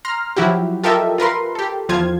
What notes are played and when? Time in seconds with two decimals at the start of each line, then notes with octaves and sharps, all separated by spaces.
0.05 A#5 C6 F6
0.36 F3 F#3 E4 F#4 G4
0.83 F4 G4 A4 A#4 D#5 E5
1.18 F4 A#4 B4 C6
1.55 G4 A4
1.89 E2 F3 F4 C5 G#6